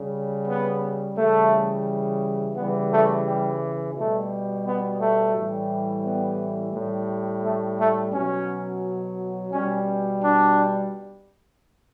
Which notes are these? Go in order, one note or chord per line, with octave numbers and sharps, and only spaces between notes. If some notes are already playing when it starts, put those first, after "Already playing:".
Already playing: C#3 G3
B3
C#3 E3 G3 A3
C#3 E3 G3 B3
A3
G3
B2 G3 A3
B3
A3
A2 E3 G3
B3
A2 G3
A3
A3
B2 F#3 C#4
B2 G3 C#4
D4